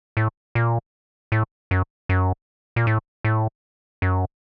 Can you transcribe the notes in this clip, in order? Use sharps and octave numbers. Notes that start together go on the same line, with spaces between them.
A2
A#2
A2
F#2
F#2
A#2
A2
A2
F#2